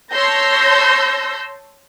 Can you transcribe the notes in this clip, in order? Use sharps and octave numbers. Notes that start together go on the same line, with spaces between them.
C#5 A5 C6 E6 G6 A#6